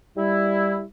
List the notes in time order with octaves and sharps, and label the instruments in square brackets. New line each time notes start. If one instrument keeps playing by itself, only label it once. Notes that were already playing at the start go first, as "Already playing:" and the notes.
[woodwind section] G3 E4